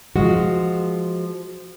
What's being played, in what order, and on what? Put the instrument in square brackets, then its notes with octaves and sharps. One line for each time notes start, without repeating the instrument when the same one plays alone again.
[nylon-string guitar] F3 G#3 F#4